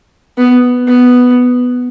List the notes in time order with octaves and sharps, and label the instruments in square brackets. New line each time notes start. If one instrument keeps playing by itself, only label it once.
[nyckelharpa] B3
B3